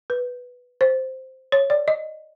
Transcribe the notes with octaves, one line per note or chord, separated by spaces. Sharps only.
B4
C5
C#5
D5
D#5